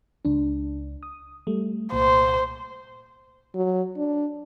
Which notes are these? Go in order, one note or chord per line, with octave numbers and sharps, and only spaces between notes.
C#2 D4
D#6
G3 A3
C2 A#2 C5
F#3
D4